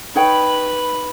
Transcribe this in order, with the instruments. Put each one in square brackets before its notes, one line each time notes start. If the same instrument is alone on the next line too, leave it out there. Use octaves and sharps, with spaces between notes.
[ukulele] D#4 C#5 G5 [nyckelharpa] B4 B5